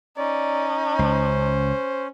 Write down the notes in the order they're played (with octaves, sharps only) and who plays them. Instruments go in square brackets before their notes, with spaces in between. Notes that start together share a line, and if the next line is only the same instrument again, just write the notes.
[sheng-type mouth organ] C#4 [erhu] D#4 [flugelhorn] D5
[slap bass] C#2 [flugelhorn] C5